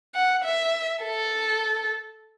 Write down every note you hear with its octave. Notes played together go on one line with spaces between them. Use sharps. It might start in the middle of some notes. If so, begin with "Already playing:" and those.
F#5
E5
A4